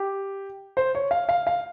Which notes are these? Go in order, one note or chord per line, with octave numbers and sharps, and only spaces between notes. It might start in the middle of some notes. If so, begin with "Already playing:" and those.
Already playing: G4
C5
C#5
F5
F5
F5